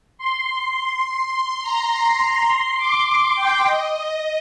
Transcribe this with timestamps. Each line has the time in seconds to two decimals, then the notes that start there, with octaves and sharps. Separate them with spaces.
0.18 C6
1.33 C6
1.62 A#5
1.91 C6
2.20 C6
2.49 C6
2.78 D6
3.07 C6
3.36 G5
3.65 D#5